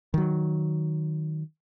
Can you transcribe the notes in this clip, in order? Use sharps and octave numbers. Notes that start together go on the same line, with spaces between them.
D#3 F#3